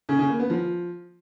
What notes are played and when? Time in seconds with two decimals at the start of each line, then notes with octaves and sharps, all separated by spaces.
0.09 C#3
0.19 C#3
0.29 A#3
0.40 B3
0.50 F3